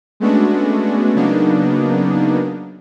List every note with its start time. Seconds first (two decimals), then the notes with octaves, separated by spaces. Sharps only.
0.20 G#3 A3 B3 C#4 D4 F#4
1.15 C#3 F#3 A#3 B3 D4 D#4